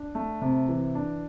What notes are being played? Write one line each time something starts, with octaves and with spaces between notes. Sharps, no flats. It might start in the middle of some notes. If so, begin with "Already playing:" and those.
Already playing: D4
A3
C3
E3
D4